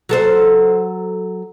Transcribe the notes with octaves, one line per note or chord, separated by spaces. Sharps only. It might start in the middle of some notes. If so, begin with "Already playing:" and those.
F#3 A4 C5